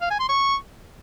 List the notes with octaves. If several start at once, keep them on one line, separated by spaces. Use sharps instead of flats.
F5
G#5
C6
C#6